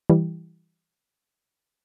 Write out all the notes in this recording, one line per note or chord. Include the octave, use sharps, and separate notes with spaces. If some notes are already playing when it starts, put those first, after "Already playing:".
E3 G3